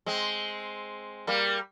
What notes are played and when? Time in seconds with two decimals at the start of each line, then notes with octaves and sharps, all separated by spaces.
0.06 G#3 C4
1.27 G3 A#3